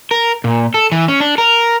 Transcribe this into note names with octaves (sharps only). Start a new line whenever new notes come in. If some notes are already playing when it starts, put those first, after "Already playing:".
A#4
A#2
A4
E3
C#4
D4
A#4